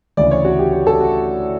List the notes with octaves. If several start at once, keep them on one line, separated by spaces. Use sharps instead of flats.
D2 C#3 E3 D5
C#5
F#4
G4
G4
A4
F#4